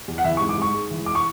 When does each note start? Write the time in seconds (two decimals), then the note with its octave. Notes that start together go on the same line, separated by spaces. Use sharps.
0.08 E2
0.18 F#5
0.24 E3 E5
0.37 C#6
0.41 G#2
0.49 D6
0.58 G#2 C#6
0.74 G#3
0.91 E3
1.06 D6
1.15 C#6